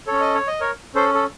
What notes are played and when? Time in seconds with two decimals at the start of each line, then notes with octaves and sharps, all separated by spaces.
0.07 C#4 A4 C#5
0.20 D#5
0.35 C#5
0.47 D#5
0.60 A#4 C#5
0.95 C#4 A4 C5
1.14 A4